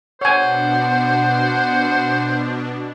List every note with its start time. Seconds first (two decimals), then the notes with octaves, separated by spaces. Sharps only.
0.21 B2 D4 C5 C#5 F#5 G#5